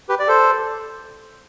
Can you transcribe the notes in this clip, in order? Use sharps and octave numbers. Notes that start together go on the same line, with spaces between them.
G4 B4
D5
A4 C5